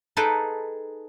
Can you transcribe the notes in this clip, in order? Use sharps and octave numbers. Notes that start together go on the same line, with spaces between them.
D#4 G#4 A4 B4 G5 A5